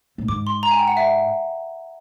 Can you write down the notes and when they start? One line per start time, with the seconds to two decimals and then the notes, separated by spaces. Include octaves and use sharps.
0.18 A2
0.28 G#2 D6
0.47 C6
0.63 A#5
0.71 G#5
0.79 G5
0.88 F#5
0.97 E5